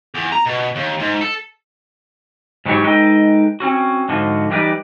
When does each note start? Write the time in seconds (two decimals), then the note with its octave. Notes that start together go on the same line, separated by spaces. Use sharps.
0.14 E2
0.32 A#5
0.47 B2
0.76 D#2
0.99 G#2
1.21 A4
2.65 G#2 D#3 E3 F#3 G4 C#5
2.84 G#3 D#4 A4 B4 D#5 G5
3.60 C4 C#4 F#4
4.09 G#2 D3 F3 F#4
4.50 E3 G3 D#4 B4 D5